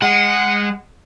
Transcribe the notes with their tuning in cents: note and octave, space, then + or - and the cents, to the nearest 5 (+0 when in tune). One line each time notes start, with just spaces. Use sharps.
G#3 -20 F#5 +0